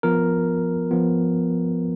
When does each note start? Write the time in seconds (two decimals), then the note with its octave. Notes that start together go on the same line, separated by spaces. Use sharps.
0.03 F3 B3 F4 A#4
0.91 F3 B3 F4